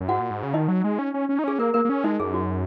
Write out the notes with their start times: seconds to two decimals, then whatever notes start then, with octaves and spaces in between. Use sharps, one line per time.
0.01 F#2
0.09 G#2 F#4 F#5
0.20 A#2
0.30 G#2
0.43 C#3
0.54 D#3 D#4 D#5
0.68 F#3
0.84 G#3
0.99 C#4
1.14 C#4
1.29 C#4
1.39 D#4
1.44 C#4 G#4
1.59 A#3 A#4
1.74 A#3 A#4
1.85 A#3
1.89 C#4
2.04 G#3 D#4 D#5
2.20 F#2 G#4
2.34 F#4